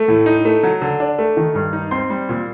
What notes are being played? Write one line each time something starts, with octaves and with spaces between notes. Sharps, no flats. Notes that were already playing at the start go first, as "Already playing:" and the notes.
Already playing: A3
A2
D#4
A3
F#3
D3
D4
A3
D#3
G2
D#4
C4 C6
G3
A#2